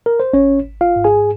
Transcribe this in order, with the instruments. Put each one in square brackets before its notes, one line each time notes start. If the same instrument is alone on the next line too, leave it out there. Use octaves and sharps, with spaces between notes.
[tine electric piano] A#4
C5
G#1 C#4 C#5
G#1
F4 F5
G#2
G#4 G#5